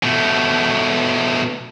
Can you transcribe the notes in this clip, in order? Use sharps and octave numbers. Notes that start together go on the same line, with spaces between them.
B2 A3